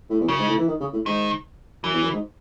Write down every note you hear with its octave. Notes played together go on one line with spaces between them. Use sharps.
A2
E2
F#2 C#3
G#2
A2
E3
D#3
C#3
A2
G#2 D#3
F#2 E3
E2
F#2
G#2